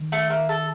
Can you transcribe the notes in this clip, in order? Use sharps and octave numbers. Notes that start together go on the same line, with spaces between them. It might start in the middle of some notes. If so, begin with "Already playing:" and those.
Already playing: D#3
A3
A#3
A4